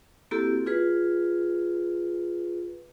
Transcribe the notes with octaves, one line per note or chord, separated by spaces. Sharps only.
A#3 C4 E4 F#4 G4 A4
F4 G#4 B4